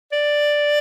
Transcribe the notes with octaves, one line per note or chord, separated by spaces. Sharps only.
D5